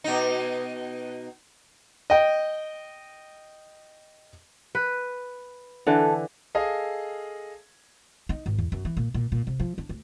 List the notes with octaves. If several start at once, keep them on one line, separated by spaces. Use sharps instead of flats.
B2 D#4
D#5 G5
B4
D3 E3 A4
G#4 A4 D#5 F5
D#4
G#1
E2
F#2
E3
A#2
A#2
A#2
C3
F3
D4
D2